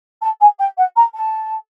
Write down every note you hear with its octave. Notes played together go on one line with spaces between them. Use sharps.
A5
G#5
G5
F#5
A#5
A5